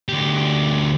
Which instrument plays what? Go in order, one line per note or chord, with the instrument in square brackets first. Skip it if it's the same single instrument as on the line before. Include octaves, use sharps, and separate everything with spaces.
[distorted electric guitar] D2 G4